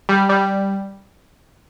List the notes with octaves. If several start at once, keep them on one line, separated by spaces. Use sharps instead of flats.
G3
G3